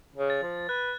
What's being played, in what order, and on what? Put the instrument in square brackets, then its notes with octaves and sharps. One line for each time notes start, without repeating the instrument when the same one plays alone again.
[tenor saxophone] C#3
[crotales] A6
[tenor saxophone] F3
[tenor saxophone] B4 [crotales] F#6